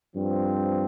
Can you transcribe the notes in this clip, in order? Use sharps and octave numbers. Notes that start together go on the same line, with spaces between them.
G2 F3 C4